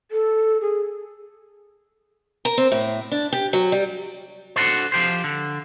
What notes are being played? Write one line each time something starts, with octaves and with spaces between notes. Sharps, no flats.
A4
G#4
A#4
C4
A2
D4
G4
F#3
G3
D4 F#4 A4 C5
F3 G4 C5
D3